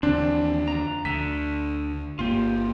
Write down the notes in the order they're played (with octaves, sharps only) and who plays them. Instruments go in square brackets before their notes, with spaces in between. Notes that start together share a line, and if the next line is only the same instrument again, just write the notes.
[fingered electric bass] D#2 D3 [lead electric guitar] E3 C4 [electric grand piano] D4
[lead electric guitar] F2 A#5
[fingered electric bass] D2 [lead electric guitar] D3 [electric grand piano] B6
[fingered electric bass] G1 A#3 [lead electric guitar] F4 G4